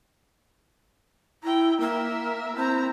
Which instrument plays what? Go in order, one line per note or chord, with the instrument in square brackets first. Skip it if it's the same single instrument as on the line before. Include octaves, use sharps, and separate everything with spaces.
[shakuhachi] E4 [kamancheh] G5 A#5
[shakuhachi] A#3 [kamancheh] A#4 E5
[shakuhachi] C4 [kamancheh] E4 A#5